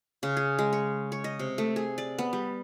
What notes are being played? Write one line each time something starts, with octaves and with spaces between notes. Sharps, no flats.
C#3
G#4
G#3
C#5
C#5
D#5
C3
A3
G#4
D5
B3
G3